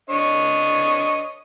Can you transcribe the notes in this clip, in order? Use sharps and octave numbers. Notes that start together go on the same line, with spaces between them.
D4 C#5 D#5